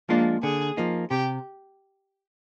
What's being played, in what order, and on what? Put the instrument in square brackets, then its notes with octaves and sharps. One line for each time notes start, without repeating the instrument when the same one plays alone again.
[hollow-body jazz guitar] F3 G#3 D4 F4 [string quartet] A#3
[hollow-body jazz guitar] D3 [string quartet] G#4
[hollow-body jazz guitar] F3 A#3 D#4
[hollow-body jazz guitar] C3 [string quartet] G4